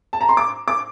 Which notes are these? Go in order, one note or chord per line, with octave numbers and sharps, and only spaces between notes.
A5
A#5
C6
D6
D6